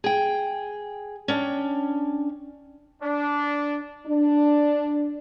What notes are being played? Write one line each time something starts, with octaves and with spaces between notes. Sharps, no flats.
G#4 G5
C#4 D4 G5
D4
D4